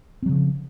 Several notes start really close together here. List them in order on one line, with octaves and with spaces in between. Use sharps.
C4 F#3 C#3 F3